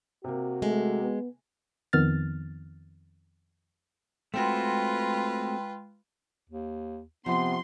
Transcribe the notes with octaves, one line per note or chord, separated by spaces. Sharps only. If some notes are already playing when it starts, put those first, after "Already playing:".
C3 A#3 F#4
G#3 A3
B3
F2 D#3 B3 F6 A6
G#3 A3 C4 F4 F#4 B4 G5 C6
D#2
C3 F3 B3 C6